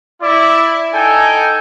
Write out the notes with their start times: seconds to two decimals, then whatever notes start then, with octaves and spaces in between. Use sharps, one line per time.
0.22 E4 D5
0.94 D#4 A4 G5 G#5